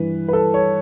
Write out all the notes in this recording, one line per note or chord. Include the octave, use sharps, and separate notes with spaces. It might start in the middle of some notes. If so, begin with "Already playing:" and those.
Already playing: G2 E3 B4
B4
A4
C#5